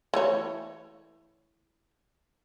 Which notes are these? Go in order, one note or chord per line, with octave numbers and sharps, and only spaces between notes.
E3 A3 C#5